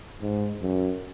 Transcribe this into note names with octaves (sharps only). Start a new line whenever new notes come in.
G#2
F#2